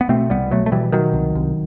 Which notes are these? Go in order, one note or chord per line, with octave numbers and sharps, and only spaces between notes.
B3
B2 A3 C4
C2 G3 B3
B2 F#3 A3
A3
B2 E3 G3
B2 D#3 F#3
C2
C2